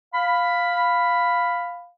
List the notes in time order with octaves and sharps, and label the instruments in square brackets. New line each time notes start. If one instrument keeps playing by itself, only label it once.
[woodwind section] F5 B5